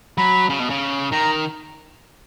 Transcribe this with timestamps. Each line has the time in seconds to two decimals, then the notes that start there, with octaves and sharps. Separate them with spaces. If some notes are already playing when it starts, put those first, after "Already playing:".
0.18 F#3 B5
0.50 C#3
0.60 B2
0.70 C#3
1.12 D#3 A#5